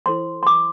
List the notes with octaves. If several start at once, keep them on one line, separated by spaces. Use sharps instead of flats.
E4 A4 C5 C6
C6
D6